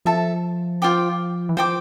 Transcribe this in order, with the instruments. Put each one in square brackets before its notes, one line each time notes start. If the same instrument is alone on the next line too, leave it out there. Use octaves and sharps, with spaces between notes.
[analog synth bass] F3 [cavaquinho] A4 E5 A5
[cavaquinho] F4 C5 G5 D6
[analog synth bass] E3
[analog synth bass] F3 [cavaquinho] C5 G5 D6